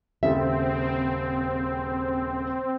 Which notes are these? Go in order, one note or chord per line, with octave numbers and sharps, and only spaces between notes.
D#1 C#3 C4 A4 E5